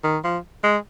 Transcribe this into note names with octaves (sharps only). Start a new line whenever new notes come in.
D#3
F3
G#3